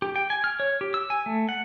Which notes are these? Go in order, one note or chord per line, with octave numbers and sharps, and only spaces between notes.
G4
G5
G#5
F6
C#5
G4
E6
G#5
A3
F#5